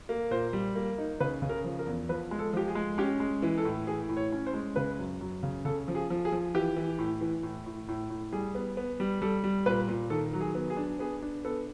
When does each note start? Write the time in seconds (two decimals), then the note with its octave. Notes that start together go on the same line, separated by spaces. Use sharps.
0.09 A#3
0.31 A#2 C5
0.53 G3
0.75 A#3
0.98 D#4
1.20 C#3 B4
1.42 C#3
1.49 A#4
1.64 F3
1.79 A#4
1.87 E2
2.09 F3 B4
2.31 G#3
2.39 A4
2.53 F3 G4
2.68 G#4
2.75 G#3
2.98 C#4 G4
3.20 G#3
3.42 E3
3.58 A4
3.65 A2
3.87 E3 G#4
4.09 A2
4.17 C#5
4.32 C#4
4.46 C5
4.54 G#3
4.76 C#3 B4
4.99 F#2
5.21 F#2
5.43 C#3
5.65 C#3 A4
5.88 F3
5.95 G#4
6.10 F3
6.25 G#4
6.32 F3
6.54 E3 G4
6.76 E3
6.99 A2
7.21 E3
7.43 A2
7.66 A2
7.88 A2
8.10 A2
8.33 G3 G#4
8.55 B3
8.77 B3
9.00 G3
9.22 G3 A4
9.44 G3
9.66 A#2 B4
9.88 A#2
10.10 D#3 A4
10.33 F#3
10.40 G#4
10.55 B3
10.70 G#4
10.77 D4
10.99 B3 G#4
11.22 D4
11.45 B3 A4